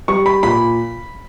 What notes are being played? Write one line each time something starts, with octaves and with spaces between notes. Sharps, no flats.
G3 C#6
B5
A#2 B5